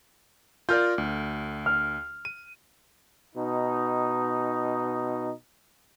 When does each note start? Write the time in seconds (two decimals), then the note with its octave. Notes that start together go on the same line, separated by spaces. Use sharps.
0.69 F4 A#4 D5 F6 G6
0.98 D2
1.66 F6
2.25 D#7
3.36 B2 D#4